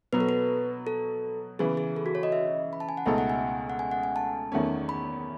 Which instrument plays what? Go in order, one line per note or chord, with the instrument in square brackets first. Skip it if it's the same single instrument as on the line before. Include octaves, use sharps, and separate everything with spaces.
[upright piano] B2 F#3 B3 F#4 [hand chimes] B4
[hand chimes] A4
B4
A4
[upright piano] C#3 E3 B3 [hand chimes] G#4
[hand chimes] G#4
A4
F#4
C#5
D#5
E5
B5
A5
G#5
F#5
[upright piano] C#2 B2 A3 D#4 A4 [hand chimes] E5
[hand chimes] F#5
G#5
F#5
G#5
F#5
G#5
A5
[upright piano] E2 D#3 A3 C#4
[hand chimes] B5